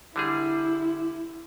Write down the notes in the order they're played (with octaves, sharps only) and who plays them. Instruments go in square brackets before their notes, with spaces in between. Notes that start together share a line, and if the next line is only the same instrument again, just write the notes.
[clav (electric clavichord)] D3 G3 G#4 [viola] E4